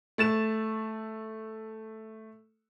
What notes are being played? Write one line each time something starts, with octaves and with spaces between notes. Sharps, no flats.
A3 A6 E7